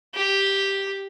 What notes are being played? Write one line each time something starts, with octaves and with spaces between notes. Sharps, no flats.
G4